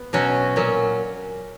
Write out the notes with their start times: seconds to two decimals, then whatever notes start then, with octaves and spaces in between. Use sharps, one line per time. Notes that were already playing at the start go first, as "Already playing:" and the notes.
Already playing: B3
0.13 B2 F#3 C#4 F#4
0.56 A#2 F#3 C#4